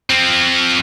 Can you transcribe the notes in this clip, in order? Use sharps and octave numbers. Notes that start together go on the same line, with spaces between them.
F3 C4